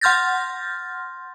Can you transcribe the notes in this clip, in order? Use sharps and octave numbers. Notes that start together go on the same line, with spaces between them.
F#5 C6 F6 G6 A6 A#6